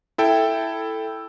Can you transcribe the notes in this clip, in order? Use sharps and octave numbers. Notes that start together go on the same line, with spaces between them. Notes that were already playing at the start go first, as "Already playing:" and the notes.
E4 A4 G5